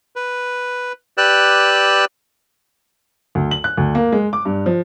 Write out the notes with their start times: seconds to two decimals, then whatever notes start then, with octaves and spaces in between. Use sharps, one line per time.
0.16 B4
1.18 G4 B4 D5 E6 F#6
3.35 D2
3.51 F#7
3.64 F#6
3.78 D2
3.95 A#3
4.12 G#3
4.33 D6
4.45 G2
4.66 F3